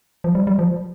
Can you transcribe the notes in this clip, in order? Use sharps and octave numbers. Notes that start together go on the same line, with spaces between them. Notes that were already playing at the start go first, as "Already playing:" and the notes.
F3
G3
G3
F3